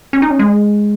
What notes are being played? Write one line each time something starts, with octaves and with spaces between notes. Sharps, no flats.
C#4
D#4
C#4
G#3